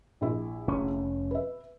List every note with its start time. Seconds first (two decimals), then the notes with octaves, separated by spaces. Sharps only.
0.21 A#1 E4
0.68 F1 C#4
1.31 B4 E5